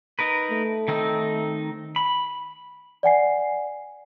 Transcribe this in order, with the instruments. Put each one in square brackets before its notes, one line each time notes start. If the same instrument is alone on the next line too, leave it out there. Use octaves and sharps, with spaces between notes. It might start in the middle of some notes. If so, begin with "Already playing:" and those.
[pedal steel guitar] D#4 A#4 B4
[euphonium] A3
[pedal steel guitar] D#3 C4 D#4
B5
[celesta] D5 F#5 G#5 C7